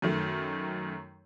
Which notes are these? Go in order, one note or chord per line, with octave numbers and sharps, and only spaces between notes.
F#2 D#3 A3